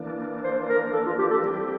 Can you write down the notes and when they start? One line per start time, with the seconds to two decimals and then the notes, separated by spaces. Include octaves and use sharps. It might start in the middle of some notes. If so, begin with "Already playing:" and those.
Already playing: E3 A#3 D4
0.44 C5
0.69 A#4
0.93 A4
1.06 F4
1.19 G4
1.30 A4
1.43 G3 C4 G4